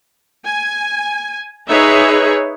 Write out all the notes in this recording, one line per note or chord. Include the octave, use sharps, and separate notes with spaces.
G#5
D#4 G#4 B4 C#5 E5